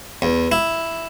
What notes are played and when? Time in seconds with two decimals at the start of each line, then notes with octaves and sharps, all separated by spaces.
0.22 E2
0.52 E4